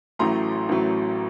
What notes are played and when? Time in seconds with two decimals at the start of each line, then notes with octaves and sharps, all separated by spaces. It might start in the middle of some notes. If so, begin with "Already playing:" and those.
0.19 A1 A2 F#3 A3 A#5 C6
0.69 A1 A2 F#3 A3